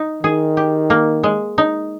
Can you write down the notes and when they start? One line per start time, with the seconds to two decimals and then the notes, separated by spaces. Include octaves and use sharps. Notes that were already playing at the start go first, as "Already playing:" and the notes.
Already playing: D#4
0.23 D#3 G#4
0.57 G4
0.90 A#3
1.23 G#3
1.58 D#4